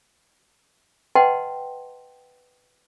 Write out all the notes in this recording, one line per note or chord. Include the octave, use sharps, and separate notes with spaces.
B4 D#5 F#5 G5 A5 C6